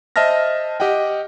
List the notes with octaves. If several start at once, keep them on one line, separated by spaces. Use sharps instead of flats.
C5 D#5 E5 A5 F6 A#6
G4 D#5 F#5 G5